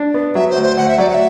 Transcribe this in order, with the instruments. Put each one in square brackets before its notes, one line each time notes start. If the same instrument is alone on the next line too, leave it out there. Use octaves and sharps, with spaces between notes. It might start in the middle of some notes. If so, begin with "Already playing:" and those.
Already playing: [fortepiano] D4
B3
[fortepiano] F#3 [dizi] E5
[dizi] C5
[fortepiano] D2
[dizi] C5
[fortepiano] D2 [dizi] F#5
[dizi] E5
[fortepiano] F#3 [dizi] D5
[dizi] F#5
E5